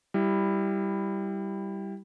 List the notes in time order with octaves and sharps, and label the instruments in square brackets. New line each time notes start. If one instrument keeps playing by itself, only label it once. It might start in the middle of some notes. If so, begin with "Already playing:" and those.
[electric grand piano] G3 E4